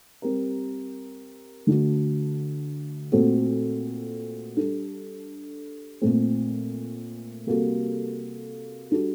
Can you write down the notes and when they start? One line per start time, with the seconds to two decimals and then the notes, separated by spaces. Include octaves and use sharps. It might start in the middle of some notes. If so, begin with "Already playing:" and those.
0.22 G3 C4 G4 A#4
1.67 D3 A3 D4 F#4
3.12 A#2 A3 C4 F#4 A4
4.56 G3 D4 A4
6.02 A#2 A3 C4
7.47 C3 G3 A#3 F#4 A4
8.91 G3 D4 F#4 A4